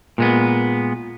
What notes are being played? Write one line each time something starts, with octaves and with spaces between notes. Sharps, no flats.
A#2 G#3 B3